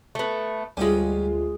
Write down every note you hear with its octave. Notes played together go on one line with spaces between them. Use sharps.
A3 B3
D2 G3 G#3 C#4 F4 G#5 B5